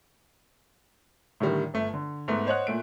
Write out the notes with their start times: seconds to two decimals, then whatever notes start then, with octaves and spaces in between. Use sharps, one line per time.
1.40 A2 D3 D#3 G3
1.74 G1 A3
1.94 D3
2.28 G#2 A3 B3
2.47 C5 C#5 D#5 F#5 F#6
2.67 A#2 A3 D7